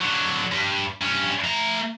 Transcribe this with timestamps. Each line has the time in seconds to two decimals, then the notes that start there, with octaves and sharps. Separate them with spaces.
0.02 D3 F#3
0.52 G2
1.01 G2 C#4
1.44 A3 A#5